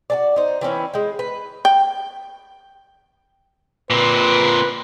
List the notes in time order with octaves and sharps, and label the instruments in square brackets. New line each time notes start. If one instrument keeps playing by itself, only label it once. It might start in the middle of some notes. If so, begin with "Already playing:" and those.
[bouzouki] F#4 A4 D5
D#4 C5
E3 C4 C#4 E4
G#3 G5
B4
[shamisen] G5
[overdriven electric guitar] A#2 C4 [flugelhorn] B4